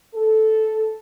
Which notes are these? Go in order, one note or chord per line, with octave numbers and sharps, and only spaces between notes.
A4